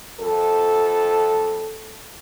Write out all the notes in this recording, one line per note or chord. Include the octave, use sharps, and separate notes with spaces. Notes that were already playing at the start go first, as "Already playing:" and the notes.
F2 A4